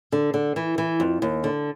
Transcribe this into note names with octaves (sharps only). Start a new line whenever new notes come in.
D3
D3
E3
E3
F2
D#2
D3